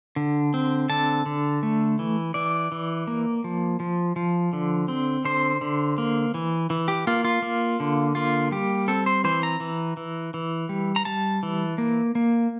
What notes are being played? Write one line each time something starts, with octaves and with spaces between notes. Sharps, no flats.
D3
C4
D3 A5
D3
A3
E3
E3 D5
E3
A#3
F3
F3
F3
D3
C4
D3 C5
D3
A#3
E3
E3
G4
A#3 F4
F4
A#3
D3
A#3 F4
G3 G4
C4 A4
C5
E3 C5
A#5
E3
E3
E3
G3
A#5
G3 A5
E3
A#3
A#3